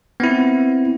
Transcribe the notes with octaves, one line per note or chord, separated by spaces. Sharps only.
B3 C4 E4